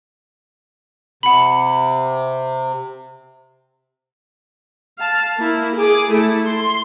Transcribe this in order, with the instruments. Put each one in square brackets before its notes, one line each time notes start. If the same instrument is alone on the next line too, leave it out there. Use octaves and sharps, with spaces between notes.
[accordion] C3 [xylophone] F#5 B5
[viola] F5 A5
A#3 E4
G#4 D6
A3 E4
C6